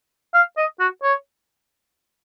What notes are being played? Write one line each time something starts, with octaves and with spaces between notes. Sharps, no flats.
F5
D#5
F#4
C#5